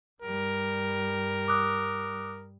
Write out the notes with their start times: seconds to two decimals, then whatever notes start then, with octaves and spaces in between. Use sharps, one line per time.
0.22 G2 G3 A#4
1.48 D6 D#6 F#6